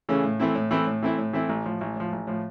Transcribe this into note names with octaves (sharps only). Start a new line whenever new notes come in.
C#3 E3 A3 C#4
A2
E3 A3 C4 E4
A2
E3 A3 C4 E4
A2
E3 A3 C4 E4
A2
E3 A3 C4 E4
A1
A2 F3
A1
A2 F3
A1
A2 F3